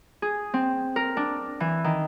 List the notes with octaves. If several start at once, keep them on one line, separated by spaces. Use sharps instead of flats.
G#4
C4
A#4
D4
E3
D#3